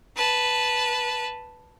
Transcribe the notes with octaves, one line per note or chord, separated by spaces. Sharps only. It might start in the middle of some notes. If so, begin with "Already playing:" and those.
B4 A5